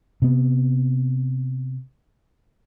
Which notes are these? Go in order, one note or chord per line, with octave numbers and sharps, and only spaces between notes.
C3 B3